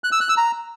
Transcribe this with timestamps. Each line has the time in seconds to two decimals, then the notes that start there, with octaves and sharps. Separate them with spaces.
0.04 F#6
0.12 E6
0.20 F#6
0.29 E6
0.37 A#5